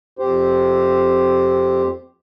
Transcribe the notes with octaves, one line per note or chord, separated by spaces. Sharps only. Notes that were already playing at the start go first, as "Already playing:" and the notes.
F2 G4 C5